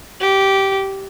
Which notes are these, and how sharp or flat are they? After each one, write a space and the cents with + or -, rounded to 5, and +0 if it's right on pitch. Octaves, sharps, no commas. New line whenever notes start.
G4 -10